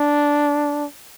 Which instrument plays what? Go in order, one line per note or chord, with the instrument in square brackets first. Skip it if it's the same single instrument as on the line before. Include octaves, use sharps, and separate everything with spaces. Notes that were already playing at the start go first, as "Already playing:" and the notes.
Already playing: [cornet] D4